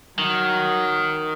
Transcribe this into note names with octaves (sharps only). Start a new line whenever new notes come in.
D#3 F#3